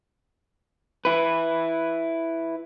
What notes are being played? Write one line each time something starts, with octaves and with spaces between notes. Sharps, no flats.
E4 B4